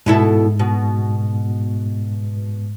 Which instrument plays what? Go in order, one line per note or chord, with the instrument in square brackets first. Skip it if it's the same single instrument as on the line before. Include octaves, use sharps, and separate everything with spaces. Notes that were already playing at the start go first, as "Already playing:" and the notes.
[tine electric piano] G#2 G#3 [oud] B2 E4 A4
[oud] B2